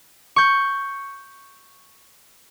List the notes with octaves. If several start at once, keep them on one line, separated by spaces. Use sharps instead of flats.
C#6 G6